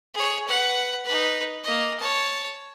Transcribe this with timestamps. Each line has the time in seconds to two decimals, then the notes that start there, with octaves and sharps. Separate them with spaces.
0.14 G#4 C#5
0.47 B4 F#5
1.05 D#4 B4
1.64 A#3 D#5
1.99 C#5 A5